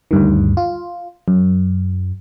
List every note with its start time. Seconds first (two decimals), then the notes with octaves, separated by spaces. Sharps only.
0.11 D2 G2 D#3
0.57 F4
1.28 F#2